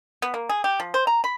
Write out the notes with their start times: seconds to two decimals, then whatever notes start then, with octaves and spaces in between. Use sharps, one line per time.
0.22 B3
0.34 A#3
0.49 G#4
0.64 G4
0.80 F3
0.94 C5
1.07 A#5
1.24 B5